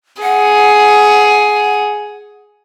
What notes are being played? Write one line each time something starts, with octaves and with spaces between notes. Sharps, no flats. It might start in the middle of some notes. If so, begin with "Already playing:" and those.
G#4 F#5